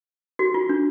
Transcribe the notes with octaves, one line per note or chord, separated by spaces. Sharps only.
F#4
F4
D4